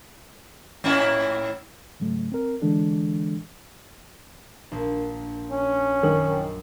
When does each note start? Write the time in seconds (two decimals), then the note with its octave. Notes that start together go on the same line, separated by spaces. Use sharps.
0.84 A2 C#4 E4
2.00 G#2 C#3 F#3 A3
2.32 C4 A#4
2.62 D3 E3 G#3 D4 A4
4.72 A#1
5.51 C#4
6.03 F#2 D#3